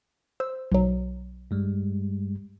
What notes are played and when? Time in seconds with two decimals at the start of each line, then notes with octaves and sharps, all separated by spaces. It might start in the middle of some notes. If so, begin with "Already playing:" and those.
0.40 C5 E6
0.72 B1 F#3
1.51 G2 G3 G#3